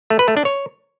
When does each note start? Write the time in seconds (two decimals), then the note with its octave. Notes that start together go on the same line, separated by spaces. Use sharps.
0.10 A3
0.19 B4
0.28 A3
0.37 D4
0.45 C#5